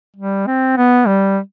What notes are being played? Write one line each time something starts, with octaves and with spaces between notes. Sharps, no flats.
G3
C4
B3
G3